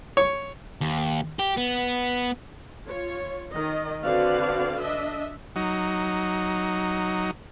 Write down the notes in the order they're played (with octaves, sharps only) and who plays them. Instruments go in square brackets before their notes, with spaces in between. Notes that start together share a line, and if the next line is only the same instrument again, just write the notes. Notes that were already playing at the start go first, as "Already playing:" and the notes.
[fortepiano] C#5
[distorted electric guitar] D#2
G4
B3
[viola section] F4 C#5
D#3 D#5
D3 C4 F#4 B4 D5 F5
D4 D#5 E5
[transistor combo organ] F#3 D#4